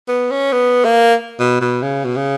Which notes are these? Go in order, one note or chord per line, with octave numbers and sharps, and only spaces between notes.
B3
C#4
B3
A#3
B2
B2
C#3
B2
C#3